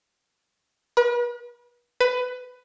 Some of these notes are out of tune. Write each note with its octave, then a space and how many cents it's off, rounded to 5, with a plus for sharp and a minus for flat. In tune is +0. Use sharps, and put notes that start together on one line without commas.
B4 -40
B4 +20